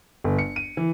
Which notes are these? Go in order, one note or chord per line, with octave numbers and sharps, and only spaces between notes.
G1
C#7
D#7
E3